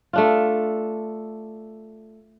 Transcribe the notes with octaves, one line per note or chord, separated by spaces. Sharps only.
A3 D4 F4